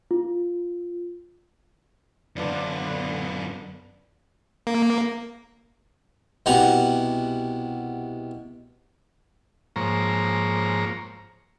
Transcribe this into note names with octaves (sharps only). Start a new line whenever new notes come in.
F4
F#2 D3 B3 D4 F4 B4 D5
A#3
C2 B2 G4 F#5 G#5 A#5
G#2 F3 A#3 C5 C#5 A#5